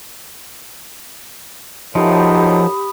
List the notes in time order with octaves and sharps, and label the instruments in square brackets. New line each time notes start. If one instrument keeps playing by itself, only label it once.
[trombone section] F#2 A2 [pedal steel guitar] F3 [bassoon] D#4 [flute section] G4 B5 D#6